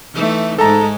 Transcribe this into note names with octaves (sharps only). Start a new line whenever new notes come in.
E3 A3 D#4
G#2 G#3 A4 A5 A#5